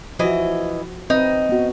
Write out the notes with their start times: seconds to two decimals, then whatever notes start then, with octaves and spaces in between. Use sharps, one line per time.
0.19 E3 F3 F#4 D#5
1.10 C4 D#4 B4
1.49 B3 F#4